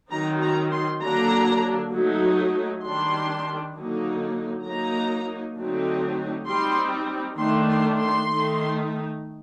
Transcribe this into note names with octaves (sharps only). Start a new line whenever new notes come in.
D#3 F#3 C4 D#4 A#5
A#5
C6
D3 F#3 A#3 D4 A#5
F#3 A3 D#4
D#3 G3 D4 C6
D3 F#3 A#3 D#4
F#3 A#3 D#4 A#5
D3 F#3 A3 C4 D#4
G3 C4 D#4 C6
D#3 A3 D4 C6
C6
C6
D#3 A3 D#4